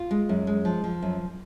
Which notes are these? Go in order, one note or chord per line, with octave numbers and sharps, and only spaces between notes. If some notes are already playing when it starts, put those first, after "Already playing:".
Already playing: F4
G#3
F#2
G#3
F3
F3
F#2